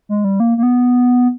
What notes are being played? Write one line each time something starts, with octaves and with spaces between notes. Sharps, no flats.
G#3
G3
A#3
A#3
B3